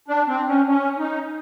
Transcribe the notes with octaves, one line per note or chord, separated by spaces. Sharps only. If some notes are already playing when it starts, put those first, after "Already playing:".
D4
C4
C#4
C#4
D#4